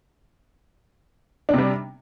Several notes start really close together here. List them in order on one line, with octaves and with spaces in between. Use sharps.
D4 C3 G3